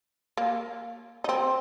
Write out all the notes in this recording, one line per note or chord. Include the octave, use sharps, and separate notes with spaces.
A#3
D#4
C4